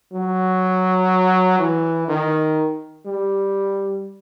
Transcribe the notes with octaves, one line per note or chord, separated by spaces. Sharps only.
F#3
E3
D#3
G3